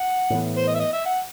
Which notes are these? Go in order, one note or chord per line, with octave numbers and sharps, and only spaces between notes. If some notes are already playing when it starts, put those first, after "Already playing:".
Already playing: F#5
A2 E3 B3
C5
D#5
E5
D#5
E5
F#5